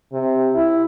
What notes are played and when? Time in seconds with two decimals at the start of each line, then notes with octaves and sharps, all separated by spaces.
0.12 C3
0.54 E4